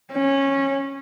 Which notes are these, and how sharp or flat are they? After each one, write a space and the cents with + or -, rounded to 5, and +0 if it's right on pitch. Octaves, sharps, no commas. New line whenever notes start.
C#4 -15